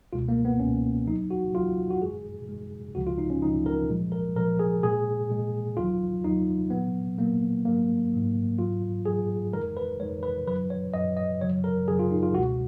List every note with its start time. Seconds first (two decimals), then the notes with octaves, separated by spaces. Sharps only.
0.13 C#2 B2 G#3 F4
0.28 A#3
0.45 B3
0.60 C#2 B2 G#3 C#4
1.07 D#2 D#3 F#3 D#4
1.31 F#4
1.54 D#2 D#3 F#3 F4
1.91 F#4
2.01 F#2 D#3 G#3 G#4
2.49 F#2 D#3 G#3
2.95 C#2 C#3 F3 G#3 F#4
3.07 F4
3.18 D#4
3.30 C#4
3.42 C#2 C#3 F3 G#3 D#4
3.66 A#4
3.89 A#2 F3 G#3
4.12 A#4
4.35 A#2 F3 G#3 A#4
4.59 G#4
4.83 A#2 G#3 G#4
5.30 A#2 G#3
5.77 D#2 D#3 F#3 F4
6.24 D#2 D#3 F#3 D#4
6.70 A#2 F#3 B3
7.18 A#2 F#3 A#3
7.65 G#2 D#3 F#3 A#3
8.12 G#2 D#3 F#3
8.58 G#2 D#3 F#3 F4
9.06 G#2 D#3 F#3 G#4
9.52 F2 D#3 G#3 A#4
9.77 B4
9.99 F2 D#3 G#3 C#5
10.23 B4
10.47 F#2 D#3 F#3 B4
10.70 C#5
10.94 F#2 D#3 F#3 D#5
11.17 D#5
11.41 F#2 C#3 F#3 C#5
11.64 A#4
11.88 F#2 C#3 F#3 G#4
11.99 F4
12.11 D#4
12.23 F4
12.34 C#2 B2 G#3 F#4